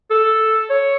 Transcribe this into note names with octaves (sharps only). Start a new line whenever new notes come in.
A4
C#5